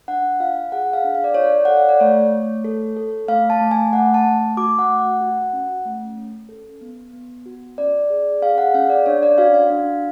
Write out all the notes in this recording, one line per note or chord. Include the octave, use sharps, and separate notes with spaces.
D4 F#5
F4 F5
G#4 F#5
F5
D4
F5
D5
F4 C#5
D5
A4 F#5
F5
D5
A3 C#5
A3
A4
A4
A3 F5
A5
A3
G#5
A3 F#5
A5
A3
F#4 D6
F#5
A3
F#5
F#4
C#4
A3
C#4
A4
B3
B3
F#4
C#4 D5
G#4
G#4 F5
F#5
C#4 F5
D5
D4 C#5
D5
F#4 F5
F5
D4